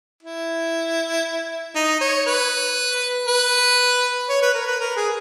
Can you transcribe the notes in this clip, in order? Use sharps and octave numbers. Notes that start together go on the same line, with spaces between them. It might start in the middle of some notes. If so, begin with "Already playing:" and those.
E4
D#4
C#5
B4
B4
C#5
B4
A#4
B4
A#4
G#4